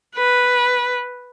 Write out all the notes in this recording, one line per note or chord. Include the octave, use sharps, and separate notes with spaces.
B4